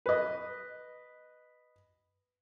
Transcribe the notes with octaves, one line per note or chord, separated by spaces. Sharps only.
B4 D#5